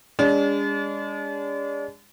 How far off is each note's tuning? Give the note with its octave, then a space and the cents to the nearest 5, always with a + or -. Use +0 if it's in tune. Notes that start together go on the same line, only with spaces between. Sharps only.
G#3 -35 D4 -40